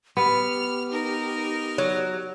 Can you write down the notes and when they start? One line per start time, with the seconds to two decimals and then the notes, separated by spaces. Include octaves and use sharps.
0.17 B3 G4 F6
0.91 D#4 A#4
1.78 F#3